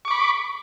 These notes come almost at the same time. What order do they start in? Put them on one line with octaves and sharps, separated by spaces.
C#6 D6 B5